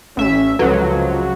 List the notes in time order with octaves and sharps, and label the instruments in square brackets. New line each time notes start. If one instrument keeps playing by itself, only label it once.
[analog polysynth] A1 E5 [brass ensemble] C#4
[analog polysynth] C#2 F#3 [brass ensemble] F#2 C3 F3 [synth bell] F#4 A4 B4